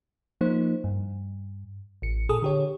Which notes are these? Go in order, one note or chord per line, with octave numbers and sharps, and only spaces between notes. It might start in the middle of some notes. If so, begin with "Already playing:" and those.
F3 A#3 D#4 C5
G2
A1 C#7
A#2 G#4 A4 D#6
D3 G4 C#5